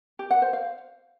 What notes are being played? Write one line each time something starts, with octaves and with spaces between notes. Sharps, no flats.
G4
F#5
C5
F5